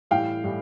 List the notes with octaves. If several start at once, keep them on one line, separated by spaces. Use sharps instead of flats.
A2 E3 G3 F5 G5
A2 E3 G3